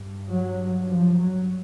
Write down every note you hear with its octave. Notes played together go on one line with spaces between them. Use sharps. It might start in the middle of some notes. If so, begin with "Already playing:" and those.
Already playing: G2
F#3
F3
F#3